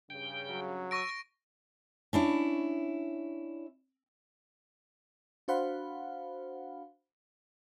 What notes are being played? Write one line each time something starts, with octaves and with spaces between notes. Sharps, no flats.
G2 C#3 G5
F#3
C#6 E6 A#6 D7
C#4 D4 E4 C#5
D4 F#4 C5 F5 F#5 B5